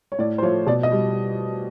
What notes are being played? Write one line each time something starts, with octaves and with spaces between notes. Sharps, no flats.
C#5
A2 D5
C5
F3 A3 C#5
B2 D5
D#5
G3